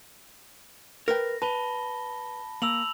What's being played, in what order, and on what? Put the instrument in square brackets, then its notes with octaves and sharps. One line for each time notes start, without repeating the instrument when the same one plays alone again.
[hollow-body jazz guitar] A#4 B4 G5 [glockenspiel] A#6
[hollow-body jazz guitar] B4 [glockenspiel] A5 B5 G7
[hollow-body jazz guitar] A#3 [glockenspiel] E6 F7 F#7